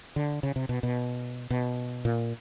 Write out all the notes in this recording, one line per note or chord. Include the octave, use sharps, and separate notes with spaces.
D3
C#3
C3
B2
B2
B2
A#2